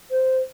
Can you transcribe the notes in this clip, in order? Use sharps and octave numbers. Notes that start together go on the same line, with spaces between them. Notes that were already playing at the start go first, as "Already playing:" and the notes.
C5